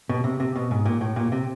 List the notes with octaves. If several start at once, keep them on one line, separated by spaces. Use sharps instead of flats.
B2
C3
C3
B2
G#2
A#2
A2
A#2
C3